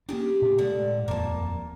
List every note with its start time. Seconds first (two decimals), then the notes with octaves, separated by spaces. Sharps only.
0.09 A#3 C#4 D4 G4 G#4
0.42 A2 C3 B3
0.59 A2 D3 G#3 A3
1.08 D#1 F2 F3 A#3 A5